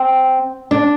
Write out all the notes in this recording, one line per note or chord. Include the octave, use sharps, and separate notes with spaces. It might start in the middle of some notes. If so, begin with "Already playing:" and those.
Already playing: C4
D4